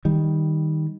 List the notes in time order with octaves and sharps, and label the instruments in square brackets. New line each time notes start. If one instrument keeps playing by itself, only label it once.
[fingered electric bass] D#3 G3